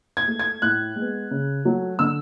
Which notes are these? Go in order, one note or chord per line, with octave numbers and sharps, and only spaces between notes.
G#6
A3
G#6
A2 F#6
G#3 B3
C#3
F#3 A3
D3 E6